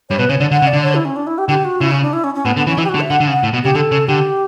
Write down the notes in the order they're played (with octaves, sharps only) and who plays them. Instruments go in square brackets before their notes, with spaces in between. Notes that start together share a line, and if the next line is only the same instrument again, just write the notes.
[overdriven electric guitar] G2 [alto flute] C#5
[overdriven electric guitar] B2 [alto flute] B4
[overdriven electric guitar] C#3 [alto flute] C#5
[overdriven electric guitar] D3 [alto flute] D5
[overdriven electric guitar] D3 [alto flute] F#5
[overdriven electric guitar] C#3
[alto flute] D5
[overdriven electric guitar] D3
[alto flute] C#5
E4
C#4
D4
E4
G4
[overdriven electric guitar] D3 [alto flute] G4
[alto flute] F#4
[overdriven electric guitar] C#3 [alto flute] E4
[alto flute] C#4
D4
E4
C#4
C#4
[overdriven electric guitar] A2 [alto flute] B3
[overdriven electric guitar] D3 [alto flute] B3
[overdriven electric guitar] E3 [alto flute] C#4
[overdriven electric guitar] E3 [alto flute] E4
[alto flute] G4
F#4
[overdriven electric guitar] D3
[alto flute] E5
[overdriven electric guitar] D3 [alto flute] F#5
[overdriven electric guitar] D3
C#3
[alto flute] F#5
[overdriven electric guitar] A2
B2
[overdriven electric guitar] C#3 [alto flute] G4
[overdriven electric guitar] D3 [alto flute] A4
[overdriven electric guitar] C#3
[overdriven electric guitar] D3 [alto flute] G4